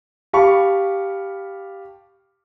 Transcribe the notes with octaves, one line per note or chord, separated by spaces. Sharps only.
G4 F5 A5 B5 C#6